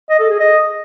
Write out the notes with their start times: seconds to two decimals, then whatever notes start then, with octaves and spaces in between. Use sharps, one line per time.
0.10 D#5
0.20 A4
0.30 G#4
0.40 D#5